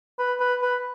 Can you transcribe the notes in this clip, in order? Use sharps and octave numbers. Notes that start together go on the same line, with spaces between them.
B4
B4
B4